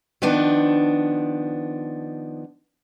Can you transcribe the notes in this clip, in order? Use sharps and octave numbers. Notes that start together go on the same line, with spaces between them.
D#3 F3 B3 D4